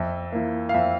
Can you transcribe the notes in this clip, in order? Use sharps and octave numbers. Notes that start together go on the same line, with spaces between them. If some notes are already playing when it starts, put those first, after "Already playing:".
Already playing: F2 E5
E3 A#3
F5
F2 E5